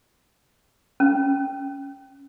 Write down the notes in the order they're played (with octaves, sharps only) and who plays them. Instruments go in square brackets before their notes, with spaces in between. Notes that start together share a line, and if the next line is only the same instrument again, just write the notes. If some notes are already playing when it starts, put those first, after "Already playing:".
[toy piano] C#4